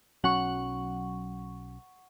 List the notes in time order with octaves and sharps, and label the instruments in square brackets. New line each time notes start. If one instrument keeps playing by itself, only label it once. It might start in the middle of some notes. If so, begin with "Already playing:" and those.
[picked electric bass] B1 F#3 C#4 [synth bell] F#5 C#6